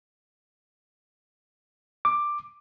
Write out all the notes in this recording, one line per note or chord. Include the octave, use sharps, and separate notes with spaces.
D6